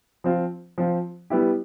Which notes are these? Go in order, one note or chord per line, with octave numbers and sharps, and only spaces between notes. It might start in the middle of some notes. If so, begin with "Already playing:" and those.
F3 C4 F4
F3 C4 F4
G3 B3 E4 G4